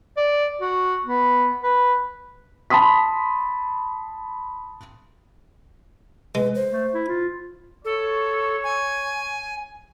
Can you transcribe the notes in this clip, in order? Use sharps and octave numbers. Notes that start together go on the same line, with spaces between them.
D5
F#4
B3
B4
A5 B5 C6 D#6 B6
G#3 B4
C5
A3
E4
F4
A4 C#5
G#5